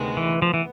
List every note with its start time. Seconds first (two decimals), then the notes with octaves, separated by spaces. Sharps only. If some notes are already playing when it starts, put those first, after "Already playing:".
Already playing: D2 C3 D#3 G#3 B3
0.17 E3
0.42 F3 B3
0.54 E3